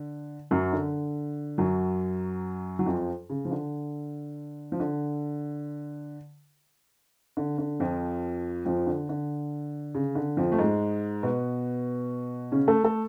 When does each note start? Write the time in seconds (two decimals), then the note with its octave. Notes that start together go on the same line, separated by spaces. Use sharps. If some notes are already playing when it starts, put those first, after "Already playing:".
Already playing: D3
0.51 F#2 F#3
0.72 D3
1.58 F#2 F#3
2.79 F#3
2.86 F2 F3
3.30 C#3
3.45 F3
3.51 D3
4.72 F3
4.80 D3
7.37 D3
7.58 D3
7.80 F2 F3
8.65 F2 F3
8.87 D3
9.09 D3
9.95 C#3
10.15 D3
10.37 F2 F3
10.52 A3
10.59 G#2 G#3
11.23 B2 B3
12.52 C#3 C#4
12.68 A3 A4
12.84 A3 A4